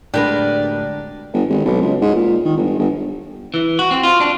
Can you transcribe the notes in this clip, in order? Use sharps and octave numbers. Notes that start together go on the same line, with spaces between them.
A2 D3 G#3 D4 G4 A#4 B4 D5
G1
G#1
B1
C#2
G#2
A#2
D#3
G1
G1
E3
F#4
C4
F4
D4